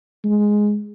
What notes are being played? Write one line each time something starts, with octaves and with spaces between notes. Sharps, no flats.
G#3